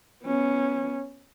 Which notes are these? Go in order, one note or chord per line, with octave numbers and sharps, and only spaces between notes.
B3 C#4